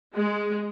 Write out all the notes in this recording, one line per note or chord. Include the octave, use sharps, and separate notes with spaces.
G#3